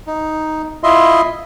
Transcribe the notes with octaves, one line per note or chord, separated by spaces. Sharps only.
D#4
E4 F4 D#5 E5 C6